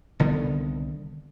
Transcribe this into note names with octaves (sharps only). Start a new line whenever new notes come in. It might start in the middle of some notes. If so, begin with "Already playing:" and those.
C2 D3 D#3 B3